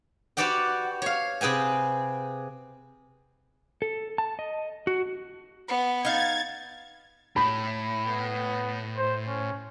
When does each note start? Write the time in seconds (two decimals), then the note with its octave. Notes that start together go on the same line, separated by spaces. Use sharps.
0.37 F#4 G4 B4 D5 F#5 G5
1.02 C#5 F5
1.41 C3 G#4 B4 G5 G#5
3.82 A4
4.18 A5
4.39 D#5
4.87 F#4
5.68 B3
6.05 D#4 F5 G#6 A6
7.36 A2 B5
8.07 B3
8.98 C5
9.28 C#4